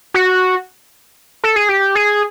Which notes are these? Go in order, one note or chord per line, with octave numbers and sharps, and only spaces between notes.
F#4
A4
G#4
G4
G#4